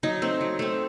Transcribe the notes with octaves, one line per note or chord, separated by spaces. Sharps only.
F#3 D#4
A3 C4
F#3
A3 C4